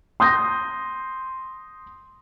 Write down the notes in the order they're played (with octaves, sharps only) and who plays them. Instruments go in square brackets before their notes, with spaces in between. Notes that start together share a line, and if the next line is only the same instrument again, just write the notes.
[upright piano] C6 D#6 G6 A#6